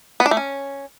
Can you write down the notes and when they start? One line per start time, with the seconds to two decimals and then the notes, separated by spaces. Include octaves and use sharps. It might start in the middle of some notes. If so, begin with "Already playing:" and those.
0.20 B3
0.26 D4
0.31 A3
0.37 C#4